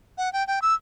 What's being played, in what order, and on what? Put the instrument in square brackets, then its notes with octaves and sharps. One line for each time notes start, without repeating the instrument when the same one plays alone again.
[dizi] F#5
G5
G5
E6